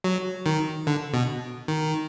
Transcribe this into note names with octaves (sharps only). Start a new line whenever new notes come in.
F#3
D#3
D3
B2
D#3